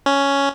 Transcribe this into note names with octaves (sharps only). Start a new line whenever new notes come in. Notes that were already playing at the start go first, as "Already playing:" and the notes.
C#4